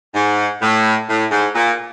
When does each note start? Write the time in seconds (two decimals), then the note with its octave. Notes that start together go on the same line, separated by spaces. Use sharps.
0.14 G#2
0.62 A2
1.08 A2
1.31 G#2
1.55 A#2